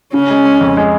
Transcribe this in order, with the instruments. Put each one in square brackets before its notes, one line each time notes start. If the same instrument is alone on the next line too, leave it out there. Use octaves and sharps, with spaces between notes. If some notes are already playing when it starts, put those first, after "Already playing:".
[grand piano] C#3 [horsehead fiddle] C#4
[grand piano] G#3
G#3
F2
G#3